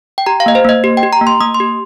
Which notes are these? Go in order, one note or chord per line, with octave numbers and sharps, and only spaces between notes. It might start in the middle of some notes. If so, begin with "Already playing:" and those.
G5
G4 A#5
F5
A#3 D#5
C5
A#3 D#5
G4
G5
G4
A#5
A#3
C6
A#3 D#6
C6
G4